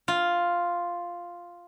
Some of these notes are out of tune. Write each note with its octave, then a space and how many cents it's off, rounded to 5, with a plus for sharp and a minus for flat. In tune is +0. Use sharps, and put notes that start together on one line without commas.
F4 +0